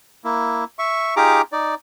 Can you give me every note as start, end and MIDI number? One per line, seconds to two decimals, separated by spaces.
0.24 0.64 58
0.24 0.64 64
0.79 1.15 76
0.79 1.15 85
1.16 1.42 63
1.16 1.42 65
1.16 1.42 67
1.16 1.42 68
1.16 1.42 82
1.16 1.42 86
1.52 1.75 63
1.52 1.75 74